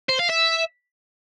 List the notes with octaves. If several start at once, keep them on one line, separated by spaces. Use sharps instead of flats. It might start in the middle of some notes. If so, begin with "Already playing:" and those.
C5
F5
E5